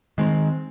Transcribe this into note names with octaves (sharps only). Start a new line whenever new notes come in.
D#3 G#3 C4